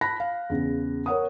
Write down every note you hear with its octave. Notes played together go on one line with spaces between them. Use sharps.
A5 B5 F#6 A#6
F5
E2 C#3
A#4 C#5 F#5 D#6